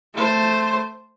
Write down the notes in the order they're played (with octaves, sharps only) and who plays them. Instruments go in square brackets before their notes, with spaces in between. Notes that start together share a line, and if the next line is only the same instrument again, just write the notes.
[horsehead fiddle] A3 C5